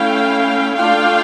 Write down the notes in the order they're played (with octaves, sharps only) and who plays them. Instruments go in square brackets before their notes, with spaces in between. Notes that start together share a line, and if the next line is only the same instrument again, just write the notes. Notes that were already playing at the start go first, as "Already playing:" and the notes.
Already playing: [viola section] A3 C#4 E4 F5 G5
A3 D4 F4 F5 G5